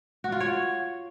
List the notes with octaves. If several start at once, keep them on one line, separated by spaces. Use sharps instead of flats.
F#4
F4
C#5